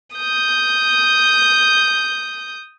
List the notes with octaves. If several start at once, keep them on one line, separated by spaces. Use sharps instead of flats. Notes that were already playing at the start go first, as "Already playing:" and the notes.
D#6 G6